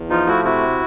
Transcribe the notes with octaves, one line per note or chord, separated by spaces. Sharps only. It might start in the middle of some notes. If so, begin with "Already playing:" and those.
Already playing: E2
F3 D#4 F4
A3 E4 F#4
C3 E4 F#4